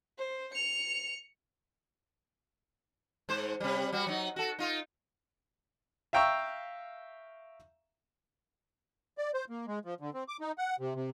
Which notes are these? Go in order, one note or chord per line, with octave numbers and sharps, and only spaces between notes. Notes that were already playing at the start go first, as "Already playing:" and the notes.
C5
C#7 F7
G#2 C5
C3 G3
G3 F#4
F#3 D#4
F#4 A4
D#4 F4
E5 F5 G5 A#5 C#6 E6
D5
C5
A#3
G#3
F3
D3
C4
D6
D#4
F#5
C3
C3